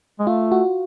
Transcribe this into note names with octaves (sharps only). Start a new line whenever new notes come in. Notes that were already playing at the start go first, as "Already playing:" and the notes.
G#3
A3 F4
F#4